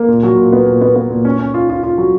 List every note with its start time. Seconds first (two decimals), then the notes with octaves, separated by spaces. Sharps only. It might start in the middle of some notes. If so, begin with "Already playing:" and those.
Already playing: A#3
0.08 A#2
0.23 F#3
0.37 A#2
0.53 B3
0.66 A#2
0.81 B3
0.95 B3
1.10 A#2
1.25 C#4
1.39 C#4
1.54 F4
1.70 F4
1.83 F4
1.98 F#3